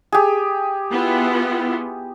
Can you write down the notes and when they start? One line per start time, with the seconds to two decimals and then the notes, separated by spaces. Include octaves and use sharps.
0.12 G4 G#4
0.91 B3 E4 F4